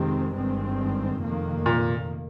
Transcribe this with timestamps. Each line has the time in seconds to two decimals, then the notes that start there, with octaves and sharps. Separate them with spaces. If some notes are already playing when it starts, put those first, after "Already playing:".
Already playing: F2 C3 D#3 G#3 C4
0.34 G1 G2 D#3 G#3 C4
1.22 F1 F2 D#3 A#3
1.66 A#2